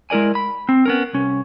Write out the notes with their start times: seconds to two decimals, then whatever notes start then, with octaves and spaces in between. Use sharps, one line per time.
0.10 G#3 E4 A#4 D5 G#5
0.35 B5
0.69 C4
0.86 B3 C#4 A#4
1.13 C2 C#4